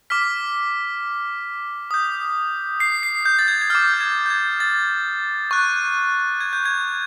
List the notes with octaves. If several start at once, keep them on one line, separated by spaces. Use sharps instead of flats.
D6 F6 B6
D#6 G6
C7
C7
G6
A6
G#6
G#6
D6 F6 A6
G6
G#6
G6
G#6
A6
C#6 F#6
G#6
G6
G#6